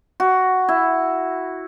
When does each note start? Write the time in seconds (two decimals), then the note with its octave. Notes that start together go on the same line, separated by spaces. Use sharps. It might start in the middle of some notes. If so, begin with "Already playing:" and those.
0.20 F#4
0.69 E4